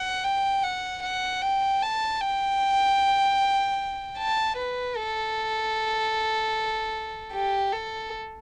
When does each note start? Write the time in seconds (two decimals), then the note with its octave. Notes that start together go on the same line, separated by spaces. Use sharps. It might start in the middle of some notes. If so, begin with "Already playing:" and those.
Already playing: F#5
0.24 G5
0.64 F#5
1.03 F#5
1.42 G5
1.82 A5
2.21 G5
4.18 A5
4.58 B4
4.97 A4
7.33 G4
7.73 A4